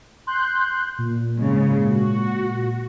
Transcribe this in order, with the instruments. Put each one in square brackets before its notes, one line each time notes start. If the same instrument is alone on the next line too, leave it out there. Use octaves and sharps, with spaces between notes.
[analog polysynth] C6 F#6 G6
A#2
[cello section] G#2 C#3 G#3
F#4